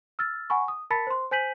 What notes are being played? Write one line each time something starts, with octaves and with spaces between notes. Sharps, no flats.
E6 F6 A6
F#5 G#5 B5 C#6
D#6
A#4 A5 B5 A6 B6 C#7
C5 C6
C5 G#5 G6 B6 D#7 F#7